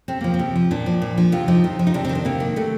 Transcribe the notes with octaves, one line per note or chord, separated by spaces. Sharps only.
C3 C4
F3 A#3
C4
C3
F3
A#2 D4
F3
A#2
F3
C3 F4
F3 D#4
C3
F3
D#4
C3 D4
C4
D#3
D4
C3 A#3
D#3
C3 A3